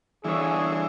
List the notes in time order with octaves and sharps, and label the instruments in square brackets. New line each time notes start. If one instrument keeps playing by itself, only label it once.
[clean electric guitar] C2 D3 C#5 [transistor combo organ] E3 [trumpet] G#4